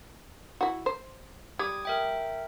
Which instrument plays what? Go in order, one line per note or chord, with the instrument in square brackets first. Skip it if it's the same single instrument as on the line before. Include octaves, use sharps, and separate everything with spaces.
[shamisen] E4 F#4
C5
[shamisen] G3 [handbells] D6 D#6 G#6
[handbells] A#4 E5 G5